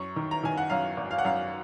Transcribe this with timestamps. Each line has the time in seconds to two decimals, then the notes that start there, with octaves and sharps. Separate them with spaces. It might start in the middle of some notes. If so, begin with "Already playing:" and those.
Already playing: F#2 C#6
0.16 D#3
0.31 A#5
0.44 D#3 G#5
0.58 F#5
0.70 F#2 F5
0.97 G#1
1.11 F5
1.19 F#5
1.25 F#2 F5